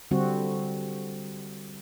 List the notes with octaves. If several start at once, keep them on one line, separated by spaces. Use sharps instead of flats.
D3 G3 C4 F#4